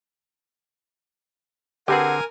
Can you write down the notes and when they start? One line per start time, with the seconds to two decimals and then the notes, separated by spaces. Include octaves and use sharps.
1.88 D3 C4 G4 G#4 A#4 B4 F#5 G#5